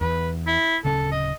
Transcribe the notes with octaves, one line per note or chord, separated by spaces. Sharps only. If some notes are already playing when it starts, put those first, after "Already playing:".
E2 B4
E4
D1 C#3 C#4 A4
D#5